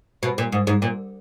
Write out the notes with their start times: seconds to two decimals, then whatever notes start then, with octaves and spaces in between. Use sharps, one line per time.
0.23 B2
0.38 A#2
0.52 G#2
0.67 G#2
0.82 A#2